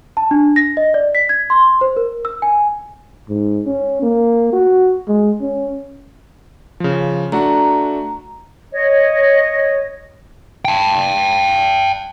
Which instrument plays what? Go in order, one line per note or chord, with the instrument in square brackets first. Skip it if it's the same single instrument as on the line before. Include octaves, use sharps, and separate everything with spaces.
[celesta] A5
D4
A#6
D#5
D5
B6
G#6
C6
C5
A#4
E6
G#5
[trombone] G#2
C#4
A#3
F#4
G#3
C#4
[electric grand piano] C#3 F3
[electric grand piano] A3 D4 F#4 [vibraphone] A#5
[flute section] C#5 D#5
[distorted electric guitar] G5 A5